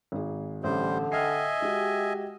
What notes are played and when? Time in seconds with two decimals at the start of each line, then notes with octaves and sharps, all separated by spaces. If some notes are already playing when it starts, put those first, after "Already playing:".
0.12 G#1 G#4
0.64 A1 D3 G3 C5
1.12 D#5 E5 G5 G#5 F6 C7
1.62 G#3 F#4 G4